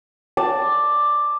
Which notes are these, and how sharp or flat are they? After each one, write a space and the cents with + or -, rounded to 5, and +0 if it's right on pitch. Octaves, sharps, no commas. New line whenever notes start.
D5 +5 A5 +0